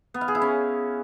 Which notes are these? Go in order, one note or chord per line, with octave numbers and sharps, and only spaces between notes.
B3
F5
G#4
E4
C#4